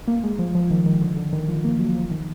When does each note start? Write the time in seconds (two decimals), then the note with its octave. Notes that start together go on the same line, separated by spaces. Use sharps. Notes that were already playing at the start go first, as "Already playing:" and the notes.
0.08 A#3
0.23 G#3
0.39 F3
0.55 F3
0.70 D#3
0.86 D#3
1.02 D3
1.17 D3
1.33 D#3
1.48 F3
1.64 A#3
1.80 F#3
1.95 F3
2.11 D#3